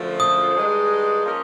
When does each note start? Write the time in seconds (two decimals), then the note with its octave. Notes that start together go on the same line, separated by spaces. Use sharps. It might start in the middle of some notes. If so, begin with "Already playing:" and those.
Already playing: F#2 D3 F3 A3
0.20 D#6
0.56 G2 D#3 G#3
1.24 F3 A#3 C#4 F4 A#4